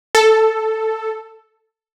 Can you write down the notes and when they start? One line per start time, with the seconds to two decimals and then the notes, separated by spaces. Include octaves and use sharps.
0.15 A4